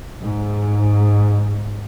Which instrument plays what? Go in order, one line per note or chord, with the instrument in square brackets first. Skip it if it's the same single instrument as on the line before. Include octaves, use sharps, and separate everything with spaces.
[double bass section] G#2